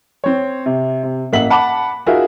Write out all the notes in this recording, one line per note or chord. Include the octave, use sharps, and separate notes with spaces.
C4 C#5
C3
C3
A1 A#3 E5 F#5 B6 F#7
F#5 A5 B5 D6
D#4 F4 F#4 G#4 A#4 E5